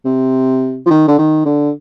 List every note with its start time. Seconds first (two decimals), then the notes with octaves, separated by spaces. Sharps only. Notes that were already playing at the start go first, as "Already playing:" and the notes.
0.05 C3
0.86 F3
0.90 D#3
1.08 D3
1.19 D#3
1.46 D3